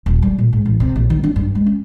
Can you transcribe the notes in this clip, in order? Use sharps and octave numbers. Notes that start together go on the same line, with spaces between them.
D#1
G3
A#2
G#2
A1
C3
A#1
D#3
D4
G2
G#3
C#4